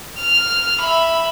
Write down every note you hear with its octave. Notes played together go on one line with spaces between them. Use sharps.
F6
E5 B5